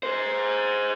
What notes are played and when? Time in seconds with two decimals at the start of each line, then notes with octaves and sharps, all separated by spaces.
0.03 G#4 C5